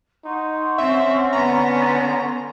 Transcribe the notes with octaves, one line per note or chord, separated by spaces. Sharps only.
D#4 F#5 C6 C#6
C4 C#4 E5
D3 B3 A#5